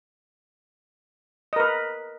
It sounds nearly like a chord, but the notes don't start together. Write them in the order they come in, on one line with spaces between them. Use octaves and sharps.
D#5 A#4 B4